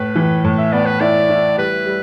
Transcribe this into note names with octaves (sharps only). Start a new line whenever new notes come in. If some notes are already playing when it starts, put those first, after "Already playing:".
Already playing: A2 B4
E3
A2
E5
B3 D5
B4
E4 D5
E4
G3 B4
G3